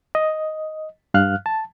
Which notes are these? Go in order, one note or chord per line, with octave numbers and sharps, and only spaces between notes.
D#5
G2 F5 F6 F#6
A5